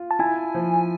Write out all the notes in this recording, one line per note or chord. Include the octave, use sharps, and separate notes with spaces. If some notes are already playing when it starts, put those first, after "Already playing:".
Already playing: F4
A5
E4 G#5
F3